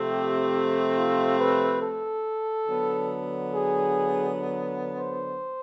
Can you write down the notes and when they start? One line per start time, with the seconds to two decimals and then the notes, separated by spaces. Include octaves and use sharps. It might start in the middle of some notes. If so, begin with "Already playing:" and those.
Already playing: C3 F3 A3 C4
0.10 G4
0.97 F4
1.39 B4
1.82 A4
2.68 D3 F#3 B3
3.54 G#4
4.97 C5